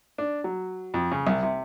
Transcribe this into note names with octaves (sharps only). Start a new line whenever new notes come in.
D4
F#3
F2
C#3
C2
C3